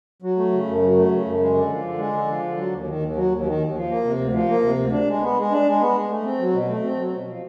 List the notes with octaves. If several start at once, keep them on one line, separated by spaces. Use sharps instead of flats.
F#3
A3
C#3
F#2
F#3
A3
C#3
F#2
G#3
D3
F3
D3
G#3
D3
F3
D3
F#3
D#2
D#3
D#2
F#3
D#2
D#3
D#2
F3
A#3
C3
D2
F3
A#3
C3
D2
D4
G#3
B3
G#3
D4
G#3
B3
G#3
A3
C4
F#3
B2
A3
C4
F#3
B2
F3